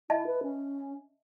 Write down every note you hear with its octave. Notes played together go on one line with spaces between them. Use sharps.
E4 D#5 E5 A5
B4
C#4